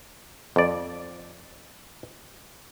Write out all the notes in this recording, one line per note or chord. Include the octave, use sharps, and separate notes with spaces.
F2 D5